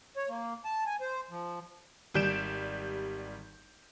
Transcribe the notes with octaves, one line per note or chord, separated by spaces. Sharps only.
C#5
A#3
A5
G#5
C5
F3
G#1 G3 G6 D7 E7